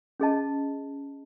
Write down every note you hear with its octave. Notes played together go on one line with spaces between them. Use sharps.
C#4 G#4 D#5 A5